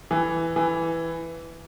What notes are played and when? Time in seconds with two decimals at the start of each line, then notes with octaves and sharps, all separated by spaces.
0.11 E3
0.56 E3